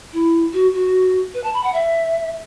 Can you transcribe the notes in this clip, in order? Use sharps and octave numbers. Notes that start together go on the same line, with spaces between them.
E4
F#4
F#4
B4
A5
B5
F#5
E5